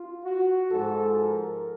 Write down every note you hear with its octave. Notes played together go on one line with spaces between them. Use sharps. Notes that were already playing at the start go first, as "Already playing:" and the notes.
Already playing: F4
F#4
G#2 F3 G#3 A4
A#4